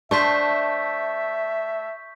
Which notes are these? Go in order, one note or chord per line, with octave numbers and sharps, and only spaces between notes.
A3 D4 C5 E5 C#6 G6 B6